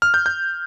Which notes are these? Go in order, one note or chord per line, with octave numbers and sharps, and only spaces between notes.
F6
G6
G6